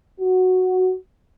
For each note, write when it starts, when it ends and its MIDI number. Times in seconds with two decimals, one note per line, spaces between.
0.20 0.97 66